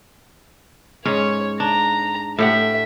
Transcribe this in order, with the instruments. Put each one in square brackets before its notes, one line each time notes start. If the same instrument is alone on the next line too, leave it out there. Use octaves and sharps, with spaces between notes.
[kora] G#2 C#4 [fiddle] C#5
[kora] D4 [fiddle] A#5
[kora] A2 G4 F#5 [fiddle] E5